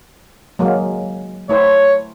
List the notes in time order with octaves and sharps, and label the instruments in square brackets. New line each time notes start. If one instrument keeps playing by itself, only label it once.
[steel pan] F#3 G#3 A#3
[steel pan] A3 E4 C5 [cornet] C#5